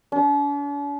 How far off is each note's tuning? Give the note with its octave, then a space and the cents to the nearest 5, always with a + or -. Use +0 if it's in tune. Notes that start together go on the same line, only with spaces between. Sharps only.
D4 -45